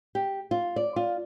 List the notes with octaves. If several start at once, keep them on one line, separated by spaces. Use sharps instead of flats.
G4
F4
D5
F4